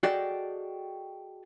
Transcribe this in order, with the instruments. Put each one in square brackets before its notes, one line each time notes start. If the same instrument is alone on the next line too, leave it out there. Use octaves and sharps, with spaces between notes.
[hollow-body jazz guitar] F#4 G#4 A4 D5 D#5 G5